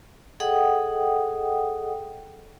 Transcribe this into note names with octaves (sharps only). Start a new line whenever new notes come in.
G#4 A4 D#5 F#5 G5 D#6